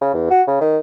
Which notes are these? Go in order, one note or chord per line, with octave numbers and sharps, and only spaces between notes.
C#3
E2
F#4
C#3
D#3